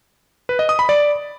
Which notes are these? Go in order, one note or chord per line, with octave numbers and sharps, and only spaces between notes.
B4
D#5
D#6
B5
D5